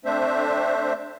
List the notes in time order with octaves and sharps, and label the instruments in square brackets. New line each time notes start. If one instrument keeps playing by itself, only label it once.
[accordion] A3 C4 D4 C5 E5